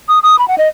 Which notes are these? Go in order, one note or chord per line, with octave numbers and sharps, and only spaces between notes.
D#6
D#6
B5
F#5
D#5